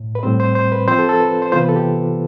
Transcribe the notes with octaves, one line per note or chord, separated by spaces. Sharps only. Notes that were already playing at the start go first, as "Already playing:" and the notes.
Already playing: A2
B4
A2 G3 C4 C5
C5
C5
B4
F3 C4 F4 C5
A4
A4
B4
C5
C3 E3 B3 F4 C5
B4
A4
G4